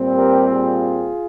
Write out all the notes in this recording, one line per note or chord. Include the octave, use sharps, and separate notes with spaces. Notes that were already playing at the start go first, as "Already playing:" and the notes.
Already playing: A#2 G3 C4
G4 A#4
F4 G#4